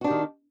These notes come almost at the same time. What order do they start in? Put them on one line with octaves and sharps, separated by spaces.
F#4 D4 G4 D#3